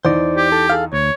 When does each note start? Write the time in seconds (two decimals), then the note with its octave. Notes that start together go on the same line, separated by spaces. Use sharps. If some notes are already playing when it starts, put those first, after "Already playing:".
0.05 E2 D#4 C5 D5
0.37 G4
0.52 A4
0.70 G#4 A4 F5
0.93 D2 C#5